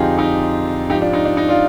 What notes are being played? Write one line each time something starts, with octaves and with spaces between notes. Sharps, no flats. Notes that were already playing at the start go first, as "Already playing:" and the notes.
Already playing: F2 D3 F3 D#4 F4 G4 G#4
D#4 G4
G#2 F3 D#4 G4
D4 F4
D#4
D4
D#4
D4 F4